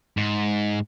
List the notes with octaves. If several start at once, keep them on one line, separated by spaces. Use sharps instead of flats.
G#2